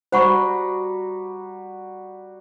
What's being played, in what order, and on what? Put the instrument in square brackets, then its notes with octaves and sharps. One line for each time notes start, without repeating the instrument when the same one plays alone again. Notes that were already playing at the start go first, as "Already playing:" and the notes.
[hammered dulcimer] G3 F#4 A#5 [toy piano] C5 F#5 C#6